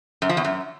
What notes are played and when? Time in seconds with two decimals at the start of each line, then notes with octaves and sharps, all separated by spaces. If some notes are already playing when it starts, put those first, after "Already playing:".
0.22 F#2
0.29 F3
0.37 E2
0.45 F#2